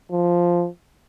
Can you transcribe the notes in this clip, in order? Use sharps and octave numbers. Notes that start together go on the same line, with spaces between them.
F3